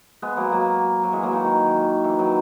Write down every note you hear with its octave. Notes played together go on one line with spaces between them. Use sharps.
G#3 B3
F#3 A#3
F#3 A#3
F#3
E3 G#3
F#3 A#3
D#3
D#3
E3
D#3 F#3